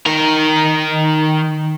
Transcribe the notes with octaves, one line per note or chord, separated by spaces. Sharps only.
D#3 A#4